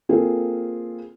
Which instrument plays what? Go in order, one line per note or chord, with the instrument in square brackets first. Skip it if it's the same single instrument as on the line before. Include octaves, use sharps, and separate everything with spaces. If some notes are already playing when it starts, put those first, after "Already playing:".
[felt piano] A#3 C4 F4 G#4 A4